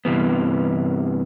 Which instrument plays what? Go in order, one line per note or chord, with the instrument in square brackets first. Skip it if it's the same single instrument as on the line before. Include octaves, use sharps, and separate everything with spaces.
[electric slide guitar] G2 C3 E3 B3